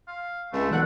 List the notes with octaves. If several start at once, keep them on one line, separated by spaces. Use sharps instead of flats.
F5
C#2 A3
B1 F#2 D3 E3 F#5